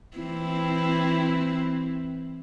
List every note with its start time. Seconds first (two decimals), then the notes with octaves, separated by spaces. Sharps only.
0.17 E3 C4 E4